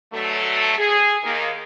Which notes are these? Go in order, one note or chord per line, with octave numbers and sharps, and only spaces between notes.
B2 D3 F#3 A3
G#4
D#2 D#3 A#3